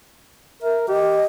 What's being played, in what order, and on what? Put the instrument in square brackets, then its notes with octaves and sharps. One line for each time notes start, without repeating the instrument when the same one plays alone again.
[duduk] A#4 [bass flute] E5
[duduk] G4 [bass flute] D#5